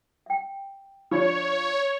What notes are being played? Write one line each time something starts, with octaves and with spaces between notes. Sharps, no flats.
E5 G5
F3 D4 C#5 B5